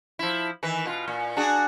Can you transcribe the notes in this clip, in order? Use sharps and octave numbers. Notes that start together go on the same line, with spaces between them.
F3 E4
D#3 E3 B4
B2 F4
A#2
D4 F#4 G#4